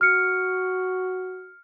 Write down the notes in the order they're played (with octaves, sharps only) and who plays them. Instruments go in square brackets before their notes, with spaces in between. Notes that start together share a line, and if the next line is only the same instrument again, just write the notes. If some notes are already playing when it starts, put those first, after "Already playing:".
[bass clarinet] F#4 [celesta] F6 C#7